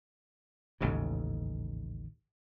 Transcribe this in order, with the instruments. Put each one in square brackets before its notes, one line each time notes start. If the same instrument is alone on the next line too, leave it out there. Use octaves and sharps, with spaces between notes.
[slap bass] A1 D#2 G#2 C#3